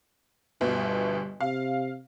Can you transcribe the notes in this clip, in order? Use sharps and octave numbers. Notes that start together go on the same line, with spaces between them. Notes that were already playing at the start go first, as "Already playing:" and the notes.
G1 D2 B2 G3
C3 F5